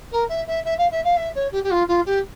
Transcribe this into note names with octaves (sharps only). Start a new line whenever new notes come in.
A#4
E5
E5
E5
F5
E5
F5
E5
C#5
G4
G4
F4
F4
G4